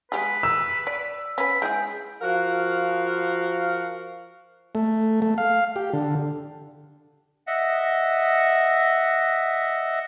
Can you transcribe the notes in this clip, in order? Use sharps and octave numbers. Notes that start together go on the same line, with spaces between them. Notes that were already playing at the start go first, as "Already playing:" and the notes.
G#3 G4 G#4 B4
E6
D5
C#4 B4 B5
G#3 E4 G#4 G5
F3 F#4 A#4 F5
A3
A3
F5
G4
D3
D#5 E5 F#5